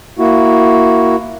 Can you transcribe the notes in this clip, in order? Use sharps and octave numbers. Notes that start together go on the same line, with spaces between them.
A#3 E4 F#4